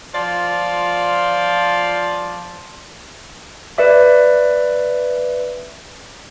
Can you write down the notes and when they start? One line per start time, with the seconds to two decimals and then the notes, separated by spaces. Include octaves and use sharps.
0.13 F3 F4 D5
3.78 B4 D5 E5 D6